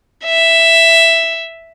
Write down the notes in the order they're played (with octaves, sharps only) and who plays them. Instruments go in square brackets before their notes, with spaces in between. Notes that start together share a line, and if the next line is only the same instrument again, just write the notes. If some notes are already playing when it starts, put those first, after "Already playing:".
[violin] E5